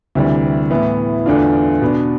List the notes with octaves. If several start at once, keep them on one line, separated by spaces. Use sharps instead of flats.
D2 C3 E3 G3
A2 E3 B3
E2 D3 A3 D4 F4
B2 B3 D4